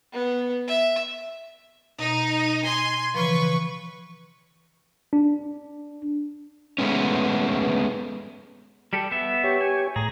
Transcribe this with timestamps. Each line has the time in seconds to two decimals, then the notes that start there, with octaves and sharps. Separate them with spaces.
0.13 B3
0.68 E5
1.99 B2 D#4
2.65 G#5 C6
3.15 C#3 E3 F3 B4 C#6
5.13 D4
6.78 G#3 A3 B3 C#4
8.93 G3 G4 A4
9.11 B3 E5
9.44 G4 C#5
9.61 G#5
9.96 A2 G#4 A#5